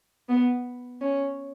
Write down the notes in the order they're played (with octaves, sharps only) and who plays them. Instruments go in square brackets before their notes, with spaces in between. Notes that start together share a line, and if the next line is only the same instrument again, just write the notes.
[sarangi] B3
C#4